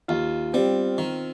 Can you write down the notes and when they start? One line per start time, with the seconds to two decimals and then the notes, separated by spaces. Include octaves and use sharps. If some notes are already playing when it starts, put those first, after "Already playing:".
0.08 D#2 F4
0.54 G3 C4
0.98 D#3